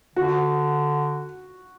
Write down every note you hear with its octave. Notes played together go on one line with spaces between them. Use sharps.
D3 F#4